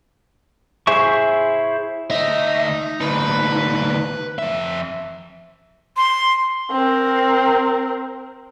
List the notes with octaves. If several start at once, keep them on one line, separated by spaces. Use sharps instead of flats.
E4 G#4 C5 E5 C#6
D2 D#4 E5
D2 D#4 B4
F2 E5
C6
C4 A#4